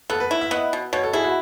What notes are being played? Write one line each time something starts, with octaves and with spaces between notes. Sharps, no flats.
B3 A4
B4
E4
E5
B3 D#5
B2
B2 C#5
A4
E4 G#4
F#4